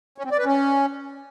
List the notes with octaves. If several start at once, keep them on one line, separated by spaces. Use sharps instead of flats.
C#4
C4
D5
B4
C#4